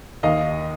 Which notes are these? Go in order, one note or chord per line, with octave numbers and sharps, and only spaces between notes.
D#2 D#5 F5